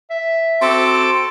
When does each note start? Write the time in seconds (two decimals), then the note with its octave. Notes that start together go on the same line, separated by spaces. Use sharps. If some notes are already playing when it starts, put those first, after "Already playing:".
0.11 E5
0.61 C4 F#4 A4 D6